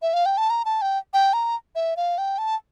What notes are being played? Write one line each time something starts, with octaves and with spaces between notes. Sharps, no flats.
E5
F5
G5
A5
A#5
A5
G5
G5
A#5
E5
F5
G5
A5